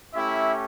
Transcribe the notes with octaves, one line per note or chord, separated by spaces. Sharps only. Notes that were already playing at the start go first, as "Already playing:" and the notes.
A3 C#4 E4 G4 E5